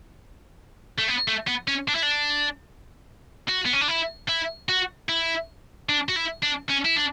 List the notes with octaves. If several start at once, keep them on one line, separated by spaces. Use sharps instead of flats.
A3
B3
A3
B3
C#4
D4
E4
D4
F#4
B3
C#4
D4
E4
E4
F#4
E4
D4
F#4
E4
D4
C#4
E4
D4